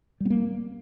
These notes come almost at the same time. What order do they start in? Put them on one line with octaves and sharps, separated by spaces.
G3 B3 A#3